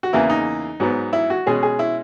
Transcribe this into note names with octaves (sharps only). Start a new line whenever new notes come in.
F#4
E2 C#3 E3 A#3 E4
D#4
G#2 F#3 B3
E4
F#4
B2 G#3 C#4 G#4
G#4
E4